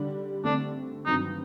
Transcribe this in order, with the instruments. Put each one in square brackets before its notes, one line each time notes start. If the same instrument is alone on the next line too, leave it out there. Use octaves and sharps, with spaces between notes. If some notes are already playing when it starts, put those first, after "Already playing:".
Already playing: [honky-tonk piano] D3 G3 D4
[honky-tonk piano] D3 A3 C4 [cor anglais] D4
[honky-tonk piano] G2 D#3 F#3 C4 [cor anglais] D#4